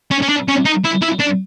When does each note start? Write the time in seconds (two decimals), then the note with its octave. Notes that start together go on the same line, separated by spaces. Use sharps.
0.11 C#4
0.22 C#4
0.29 D4
0.48 C#4
0.65 D#4
0.84 E4
1.02 E4
1.20 D4